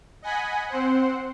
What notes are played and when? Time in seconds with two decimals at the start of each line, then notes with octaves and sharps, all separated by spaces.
0.22 D#5 F#5 G#5 B5
0.67 C4 C5 F#5